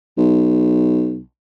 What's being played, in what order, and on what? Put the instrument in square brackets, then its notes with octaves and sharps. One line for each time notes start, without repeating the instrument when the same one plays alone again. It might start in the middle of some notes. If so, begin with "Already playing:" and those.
[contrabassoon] B1